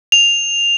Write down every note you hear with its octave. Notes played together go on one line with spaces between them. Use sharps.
F7